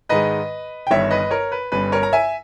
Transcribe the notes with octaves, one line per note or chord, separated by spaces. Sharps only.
G#2 D#3 G#3 B4 D#5
G5
G1 G2 D#3 G3 C#5 E5
B4 D#5
A#4 C#5
B4
G1 G2 G3 C#4 B4
A#4 C#5
A#5
E5 G#5